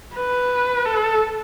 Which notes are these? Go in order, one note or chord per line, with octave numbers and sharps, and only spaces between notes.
B4
A4